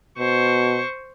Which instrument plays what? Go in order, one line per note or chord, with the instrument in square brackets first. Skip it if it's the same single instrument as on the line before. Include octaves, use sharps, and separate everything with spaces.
[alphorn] B2 [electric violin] C5 C#6